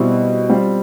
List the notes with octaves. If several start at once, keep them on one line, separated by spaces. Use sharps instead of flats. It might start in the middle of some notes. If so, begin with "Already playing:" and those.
Already playing: B2 G3 C4 E4
G3 C4 F4